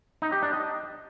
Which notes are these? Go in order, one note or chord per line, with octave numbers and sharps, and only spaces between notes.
D#4
G4
D4
D#5